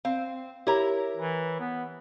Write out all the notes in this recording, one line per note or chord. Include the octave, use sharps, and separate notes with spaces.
C4 F5
E4 G4 A#4 C#5 A#5
E3
B3